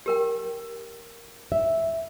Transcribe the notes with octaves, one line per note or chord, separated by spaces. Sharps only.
G4 A#4 G5
E5